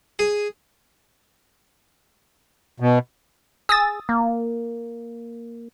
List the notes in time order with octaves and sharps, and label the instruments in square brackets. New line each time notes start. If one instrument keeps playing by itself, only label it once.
[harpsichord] G#4
[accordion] B2
[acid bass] G#4 [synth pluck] D#6 E6 A6
[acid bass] A#3